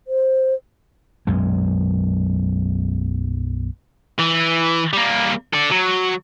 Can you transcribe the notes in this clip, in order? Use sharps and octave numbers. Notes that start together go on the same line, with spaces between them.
C5
B1 F#2 G#3
E3
G3 A#3
A4 D5
F#3